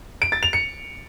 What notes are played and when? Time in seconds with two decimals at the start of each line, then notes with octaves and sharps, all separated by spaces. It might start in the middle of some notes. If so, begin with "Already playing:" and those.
0.22 D7
0.32 A6
0.43 F7
0.53 C#7